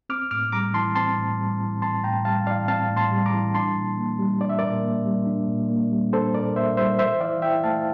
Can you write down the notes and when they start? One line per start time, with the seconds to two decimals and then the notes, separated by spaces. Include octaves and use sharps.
0.09 C4 D6 F6
0.31 A2 D6 F6
0.52 G3 A#5 D6
0.74 E3 A5 C6
0.95 C4 A5 C6
1.17 A2
1.39 G3
1.60 E3
1.82 C4 A5 C6
2.03 A2 G5 A#5
2.25 G3 F5 A5
2.46 E3 D5 F5
2.68 C4 F5 A5
2.90 A2
2.97 A5 C6
3.11 G3
3.26 A#5 D6
3.33 E3
3.54 D4 A5 C6
3.76 A#2
3.97 A#3
4.19 G3
4.40 D4 D5
4.49 E5
4.59 A#2 A#4 D5
4.84 A#3
5.05 G3
5.26 D4
5.48 A#2
5.70 A#3
5.91 G3
6.13 D4 A4 C5
6.34 A#2 A#4 D5
6.56 A#3 C5 E5
6.77 G3 C5 E5
6.99 E3 C5 E5
7.21 E3 D5 F5
7.42 E4 E5 G5
7.64 A3 F5 A5